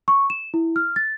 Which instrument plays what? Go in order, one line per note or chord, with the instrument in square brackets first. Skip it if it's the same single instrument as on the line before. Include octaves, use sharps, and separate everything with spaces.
[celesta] C#6
E7
E4
F6
A6